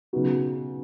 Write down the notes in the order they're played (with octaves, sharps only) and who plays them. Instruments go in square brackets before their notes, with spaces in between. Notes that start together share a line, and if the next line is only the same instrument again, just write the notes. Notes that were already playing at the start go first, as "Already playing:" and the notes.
[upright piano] C#3 F#3 B3 D#4 F#4